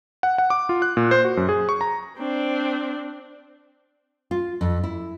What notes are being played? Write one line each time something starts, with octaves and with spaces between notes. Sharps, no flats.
F#5
F#5
D6
F4
F#6
A#2
C5
F#4
F#2
G#4
C#6
A#5
C4 D4
F4
F2
E4